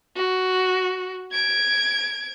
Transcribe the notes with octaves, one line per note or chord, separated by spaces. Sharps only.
F#4
G#6 D7